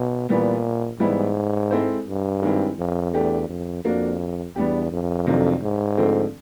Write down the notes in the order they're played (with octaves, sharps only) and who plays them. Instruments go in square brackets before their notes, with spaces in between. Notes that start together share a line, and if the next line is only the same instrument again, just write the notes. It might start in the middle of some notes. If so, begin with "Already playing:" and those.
Already playing: [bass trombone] B2
[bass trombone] A#2 [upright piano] E3 G3 B3
[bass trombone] G#2 [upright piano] E3 G3 B3 E4
[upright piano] G#3 C4 E4 A4 C5
[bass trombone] G2
[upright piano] D#3 G#3 C4 E4
[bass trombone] F2
[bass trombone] E2 [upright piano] A3 D4 G4
[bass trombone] F2
[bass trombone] F2 [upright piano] A#3 D4 F#4
[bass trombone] E2 [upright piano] G3 B3 D4 G4
[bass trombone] F2
[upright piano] C3 D#3 F#3 A3 D4
[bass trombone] G#2
[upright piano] D3 F3 A3 C4